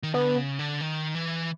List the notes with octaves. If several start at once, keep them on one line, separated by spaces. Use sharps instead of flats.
D#3
D3 B3
C#3
D3
D#3
E3